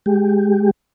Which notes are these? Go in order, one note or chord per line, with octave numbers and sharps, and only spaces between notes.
G#3 G4